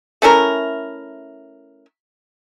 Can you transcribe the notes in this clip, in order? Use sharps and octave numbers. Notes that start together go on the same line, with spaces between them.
A3 C#4 E4 A#4